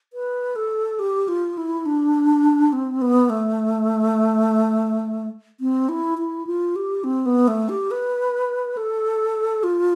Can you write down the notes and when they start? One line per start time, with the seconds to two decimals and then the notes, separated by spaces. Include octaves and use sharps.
0.13 B4
0.56 A4
0.99 G4
1.28 F4
1.58 E4
1.86 D4
2.73 C4
3.02 B3
3.30 A3
5.60 C4
5.89 E4
6.18 E4
6.47 F4
6.76 G4
7.04 C4
7.26 B3
7.48 A3
7.69 G4
7.91 B4
8.77 A4
9.63 F4